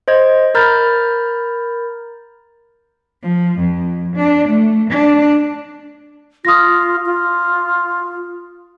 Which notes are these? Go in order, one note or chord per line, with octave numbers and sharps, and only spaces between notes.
C5 D#5 G#6
A#4 A#5 B5 F6 G6 A6
F3
F2
D4
A3
D4
F4 D#6 A#6
F4